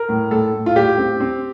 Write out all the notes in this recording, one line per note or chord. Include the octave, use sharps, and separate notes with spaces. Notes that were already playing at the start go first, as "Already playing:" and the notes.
Already playing: A#4
A2
A2 A4
A2
F4
A2 G4
C4
C4